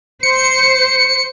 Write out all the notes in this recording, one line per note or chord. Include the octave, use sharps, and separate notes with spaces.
C5 C#7